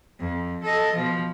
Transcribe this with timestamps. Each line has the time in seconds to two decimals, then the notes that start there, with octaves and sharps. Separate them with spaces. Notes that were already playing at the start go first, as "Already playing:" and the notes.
0.20 F2
0.64 A4 D#5
0.93 B2 F3